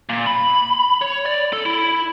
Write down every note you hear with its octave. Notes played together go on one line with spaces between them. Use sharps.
A#2
B5
C#5
D5
A4
E4